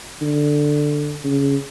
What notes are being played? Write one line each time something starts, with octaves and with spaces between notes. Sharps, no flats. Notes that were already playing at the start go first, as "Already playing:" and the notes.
D3
C#3